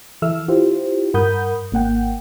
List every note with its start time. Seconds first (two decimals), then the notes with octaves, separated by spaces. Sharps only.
0.22 E3 A4 E5 E6 F6
0.48 E4 F4 G4 C5
1.14 G2 A#4 F#5 B5 D#6 G6
1.72 G#1 A#3 F#5 G5